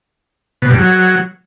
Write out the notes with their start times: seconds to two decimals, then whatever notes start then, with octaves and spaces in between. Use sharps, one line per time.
0.62 B2
0.70 G2
0.78 F#3